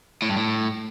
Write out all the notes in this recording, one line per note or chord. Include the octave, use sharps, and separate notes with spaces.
A2
G2
A2